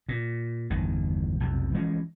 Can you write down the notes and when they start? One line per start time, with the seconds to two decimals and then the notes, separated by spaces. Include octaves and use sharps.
0.09 A#2
0.70 G1 E2 D#3
1.40 B1 F2 C3
1.75 E3 F3 G#3 C#4